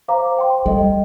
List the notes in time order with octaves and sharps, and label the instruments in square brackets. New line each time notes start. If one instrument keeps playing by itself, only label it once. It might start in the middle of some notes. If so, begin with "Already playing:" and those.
[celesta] C5 F5 A#5 D6
C5 G5 C6
[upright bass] G3 [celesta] A4 D#5 G5